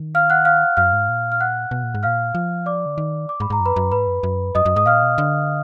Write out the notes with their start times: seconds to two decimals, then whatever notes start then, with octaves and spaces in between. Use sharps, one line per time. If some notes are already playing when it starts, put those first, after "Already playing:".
Already playing: D#3
0.15 F5 F6
0.30 F#5 F#6
0.45 F5 F6
0.77 F#2 F5 F6
0.93 G#2
1.09 A#2
1.32 F6
1.41 F#5 F#6
1.71 B2
1.83 A#2
1.95 G#2
2.03 A#2 F5 F6
2.35 F3
2.66 D5 D6
2.86 D3
2.98 D#3
3.29 D6
3.40 G#2 B5
3.50 G#2 A#5
3.60 F#2
3.66 B4 B5
3.76 F#2
3.92 G#2 B4 B5
4.07 F#2
4.23 F#2
4.55 F#2 D#5 D#6
4.66 F#2
4.76 G#2 D#6
4.86 A#2 F5 F6
5.03 B2
5.18 D3